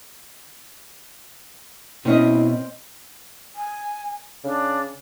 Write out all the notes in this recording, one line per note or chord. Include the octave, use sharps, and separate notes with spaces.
B2 C4 C#4 E4 D#5
G#5
C#3 D4